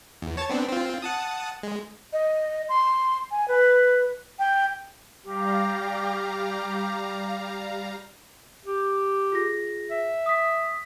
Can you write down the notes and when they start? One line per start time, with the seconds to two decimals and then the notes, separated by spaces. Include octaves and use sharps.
0.22 E2
0.37 C#5 A5 A6
0.50 B3 C4 D4
0.68 C4 F4
1.02 F#5 A5 D#6
1.63 G#3
2.13 D#5
2.69 C6
3.31 G#5
3.48 B4
4.39 G5
5.24 G3 G4 F5 A#5
8.66 G4
9.32 F4 G#4 A#6
9.91 E5
10.26 D#6 B6